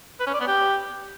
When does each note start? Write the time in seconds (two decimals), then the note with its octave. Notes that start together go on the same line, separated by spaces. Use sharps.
0.20 B4
0.27 C#4
0.33 D5
0.40 B3
0.47 G4